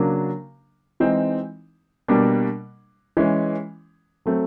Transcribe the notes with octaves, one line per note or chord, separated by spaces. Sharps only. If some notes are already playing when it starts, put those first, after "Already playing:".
Already playing: C#3 F#3 A#3 D4
E3 G#3 C4 D#4
B2 G3 A#3 D4
E3 G#3 C#4
F#3 A3 C4